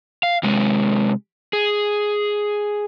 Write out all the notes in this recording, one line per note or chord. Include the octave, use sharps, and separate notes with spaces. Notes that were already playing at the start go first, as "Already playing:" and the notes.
F5
C3 G#3
G#4